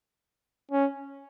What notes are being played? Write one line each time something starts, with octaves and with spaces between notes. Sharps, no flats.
C#4